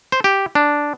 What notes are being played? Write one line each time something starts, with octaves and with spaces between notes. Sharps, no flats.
C5
G4
D4